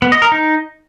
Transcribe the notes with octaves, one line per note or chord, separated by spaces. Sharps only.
B3
D#5
A#4
D#4